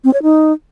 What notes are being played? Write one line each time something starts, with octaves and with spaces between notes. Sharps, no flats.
C4
C#5
D#4